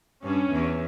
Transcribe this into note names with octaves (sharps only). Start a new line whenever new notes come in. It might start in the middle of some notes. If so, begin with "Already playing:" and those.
G2 C#4
E2